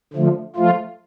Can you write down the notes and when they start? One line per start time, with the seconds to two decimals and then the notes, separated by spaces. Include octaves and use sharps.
0.14 D3 F3 A3
0.56 F3 A3 F4